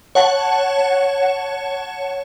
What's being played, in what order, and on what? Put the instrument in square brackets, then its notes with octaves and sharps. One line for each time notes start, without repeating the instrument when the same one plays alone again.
[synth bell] C#5 F#5 A5